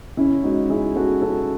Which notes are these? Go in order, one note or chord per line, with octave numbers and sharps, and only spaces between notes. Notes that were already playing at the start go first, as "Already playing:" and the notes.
C#3 C#4 E4
G#3 D#4 F#4
C#3 E4 G#4
G#3 F#4 A4
C#3 F#4 A4